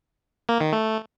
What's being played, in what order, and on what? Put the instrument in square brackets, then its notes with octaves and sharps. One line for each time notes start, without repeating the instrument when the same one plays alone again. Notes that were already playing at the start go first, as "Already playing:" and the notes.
[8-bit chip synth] A#3
D#3
A3